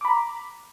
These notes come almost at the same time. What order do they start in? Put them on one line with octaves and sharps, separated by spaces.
D6 B5 A#5